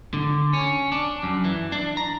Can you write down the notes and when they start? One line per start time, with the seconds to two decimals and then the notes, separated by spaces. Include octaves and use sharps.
0.14 D3
0.53 C#4
0.92 D4
1.23 F#2
1.45 E3
1.72 D4
1.97 A#5